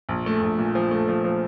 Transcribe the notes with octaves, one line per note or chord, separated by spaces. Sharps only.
A#1
A3
A#1
A#2
F3
A3
F3
F3